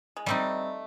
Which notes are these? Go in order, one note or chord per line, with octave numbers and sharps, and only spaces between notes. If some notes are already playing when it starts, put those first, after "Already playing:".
G#3
G3 A3 C4 D#4